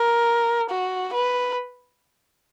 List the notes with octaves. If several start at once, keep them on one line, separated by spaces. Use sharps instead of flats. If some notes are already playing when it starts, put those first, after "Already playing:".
Already playing: A#4
F#4
B4